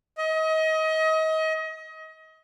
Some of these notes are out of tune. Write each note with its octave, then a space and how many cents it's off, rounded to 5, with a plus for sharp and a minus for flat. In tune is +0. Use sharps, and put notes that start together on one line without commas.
D#5 +30